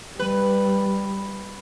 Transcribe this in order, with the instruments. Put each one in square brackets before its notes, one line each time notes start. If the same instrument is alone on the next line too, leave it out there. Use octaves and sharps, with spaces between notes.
[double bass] G3 [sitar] B4